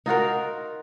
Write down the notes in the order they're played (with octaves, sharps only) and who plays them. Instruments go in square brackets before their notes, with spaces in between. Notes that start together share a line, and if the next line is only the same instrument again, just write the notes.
[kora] D#4 F4 F#4 A#4